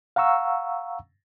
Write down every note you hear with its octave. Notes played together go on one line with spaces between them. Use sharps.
F5 F#5 A#5 C#6 E6